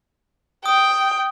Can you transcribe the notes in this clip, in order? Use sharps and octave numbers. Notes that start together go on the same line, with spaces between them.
G5 D#6